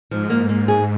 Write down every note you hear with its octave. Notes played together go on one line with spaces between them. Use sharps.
G#2 F3
A#3
A#3
G#4